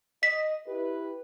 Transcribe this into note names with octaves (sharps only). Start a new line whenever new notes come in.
D#5 B6
E4 G4 B4